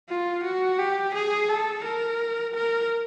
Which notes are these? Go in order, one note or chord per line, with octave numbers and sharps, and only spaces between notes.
F4
F#4
G4
G#4
A4
A#4
A#4